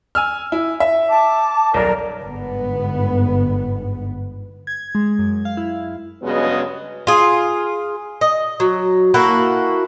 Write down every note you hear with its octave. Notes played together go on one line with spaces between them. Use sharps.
G#5 E6 F6
E4
E5
A5 D6
D#1 B1 A#4 D5
G1 G#2 B3
G#6
G#3
F#2
F5
E4
G2 C#3 F#3 G#3 B3 D#5
F4 G#4
D#5
F#3
A#3 E4 F#4 A4